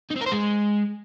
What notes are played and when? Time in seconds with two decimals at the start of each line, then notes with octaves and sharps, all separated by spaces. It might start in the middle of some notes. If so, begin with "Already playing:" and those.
0.11 D#4
0.16 C4
0.21 A#4
0.26 C5
0.32 G#3